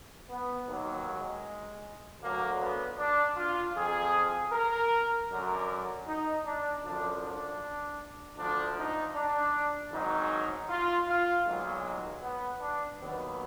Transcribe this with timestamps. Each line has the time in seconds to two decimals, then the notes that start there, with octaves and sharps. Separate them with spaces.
0.30 B3
0.68 D#2 D#3 F#3 A#3
1.06 G#3
2.21 D2 D3 F#3 A#3
2.60 B3
2.98 D4
3.37 F4
3.75 F2 F3 G#4
4.52 A#4
5.30 F#2 D3 F#3 A#4
6.07 D#4
6.45 D4
6.84 F#2 D3 F3 D4
7.23 D4
8.37 D2 D3 F3 D4
8.77 D#4
9.15 D4
9.92 G#1 G#2 F#3 D#4
10.69 F4
11.07 F4
11.46 B1 A#2 F#3 G#3
12.23 B3
12.61 D4
13.00 D#2 D#3 F#3 B3